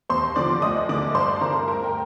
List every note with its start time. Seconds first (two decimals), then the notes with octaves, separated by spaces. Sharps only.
0.10 D#2 C5 C6
0.36 D3 F3 D5 D6
0.62 D2 D#5 D#6
0.89 D3 A3 D5 D6
1.14 G2 C5 C6
1.36 A5
1.41 D3 A3 A#4 A#5
1.68 D2 A#4 A#5
1.84 G5